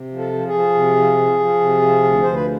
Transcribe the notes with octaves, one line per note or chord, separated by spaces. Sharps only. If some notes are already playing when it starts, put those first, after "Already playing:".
Already playing: C3
F3
A4
F3
G#4
F3
C3
F3
F3
F3
C3
F3
D2
D2 C5
B4